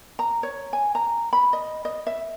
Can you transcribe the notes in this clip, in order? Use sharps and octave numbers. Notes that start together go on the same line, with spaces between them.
A#5
C#5
G#5
A#5
B5
D#5
D#5
E5